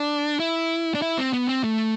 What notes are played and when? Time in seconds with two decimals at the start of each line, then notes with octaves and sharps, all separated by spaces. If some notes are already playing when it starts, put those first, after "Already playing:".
Already playing: D4
0.40 E4
0.94 D4
1.02 E4
1.18 C4
1.33 B3
1.48 C4
1.64 A3